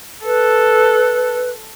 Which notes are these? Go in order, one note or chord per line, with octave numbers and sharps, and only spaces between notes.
A4 B4